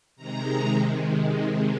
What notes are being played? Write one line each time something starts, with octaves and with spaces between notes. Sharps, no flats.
C3 D#3 G#3 A#5